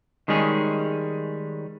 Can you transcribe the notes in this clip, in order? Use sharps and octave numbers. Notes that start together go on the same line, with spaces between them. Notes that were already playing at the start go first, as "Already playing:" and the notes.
D#3 G3 G#3 C#4 G#4